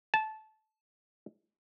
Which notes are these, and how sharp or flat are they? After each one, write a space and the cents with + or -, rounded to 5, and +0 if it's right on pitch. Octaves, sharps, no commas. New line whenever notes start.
A5 -15